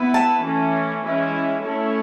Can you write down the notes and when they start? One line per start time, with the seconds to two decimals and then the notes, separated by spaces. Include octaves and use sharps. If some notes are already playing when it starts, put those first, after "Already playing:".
Already playing: B3 E4 B4
0.14 A5
0.44 E3 A3 C#4
1.03 E3 G#3 C#4 E4
1.63 A3 C#4 E4 A4 C#5